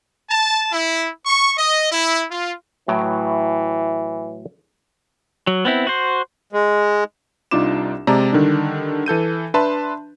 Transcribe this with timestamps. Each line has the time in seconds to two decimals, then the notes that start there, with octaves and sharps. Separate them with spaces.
0.30 A5
0.71 E4
1.25 C#6
1.58 D#5
1.92 E4
2.31 F4
2.88 A2 E3 F#3 G5
5.47 F#3
5.65 B3 C4 E4
5.87 F#4 C5
6.53 G#3
7.51 C2 D4 D#4 F4 D6 E7
8.07 C3 G#3 D5 A5 A#5
8.33 D3 D#3 G3 D4
9.06 E3 A4 G6 D#7
9.54 D4 B4 E5 A5 C6